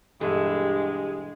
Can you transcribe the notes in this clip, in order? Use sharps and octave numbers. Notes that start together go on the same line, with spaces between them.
G2 B2 E3 G#3 G4 A4